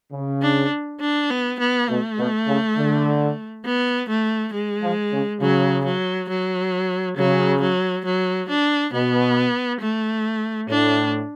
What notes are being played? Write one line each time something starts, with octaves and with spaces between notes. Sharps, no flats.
C#3
D4
D4
B3
B3
B2 A3
B2
C#3
D3
B3
A3
G#3
F3
C#3
C#3 F#3
F#3
F#3
C#3 F#3
F#3
F#3
D4
B2 B3
A3
A2 D4